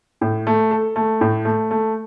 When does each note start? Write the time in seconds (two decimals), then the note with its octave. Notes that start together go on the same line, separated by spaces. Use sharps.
0.21 A2
0.47 A3
0.71 A4
0.96 A3
1.21 A2
1.45 A3
1.71 A3